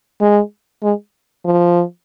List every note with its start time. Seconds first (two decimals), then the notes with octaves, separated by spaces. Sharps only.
0.21 G#3
0.83 G#3
1.45 F3